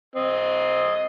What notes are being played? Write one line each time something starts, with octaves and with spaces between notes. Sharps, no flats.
C4 D#5